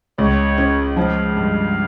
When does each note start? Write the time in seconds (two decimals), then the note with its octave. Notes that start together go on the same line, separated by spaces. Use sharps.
0.18 C#2 C#5
0.58 C#4
0.97 F3 F5
1.37 G2